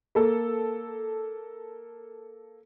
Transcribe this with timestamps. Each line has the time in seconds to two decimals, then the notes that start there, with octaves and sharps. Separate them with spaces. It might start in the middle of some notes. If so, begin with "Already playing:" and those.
0.15 A#3 A4